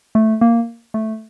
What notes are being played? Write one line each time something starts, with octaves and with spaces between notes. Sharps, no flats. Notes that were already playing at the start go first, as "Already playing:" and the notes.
A3
A#3
A3